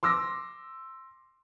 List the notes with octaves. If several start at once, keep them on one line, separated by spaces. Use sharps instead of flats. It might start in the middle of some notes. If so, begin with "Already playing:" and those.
C6 D6 E6 A#6